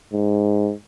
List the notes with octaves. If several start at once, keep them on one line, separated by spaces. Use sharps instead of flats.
G#2